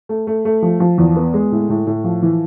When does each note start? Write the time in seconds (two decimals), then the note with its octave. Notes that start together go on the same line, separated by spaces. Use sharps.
0.09 A3
0.27 A3
0.45 A3
0.62 F3
0.80 F3
0.98 E2
1.16 B3
1.34 G#3
1.52 A2
1.70 A2
1.87 A2
2.04 F3
2.22 E3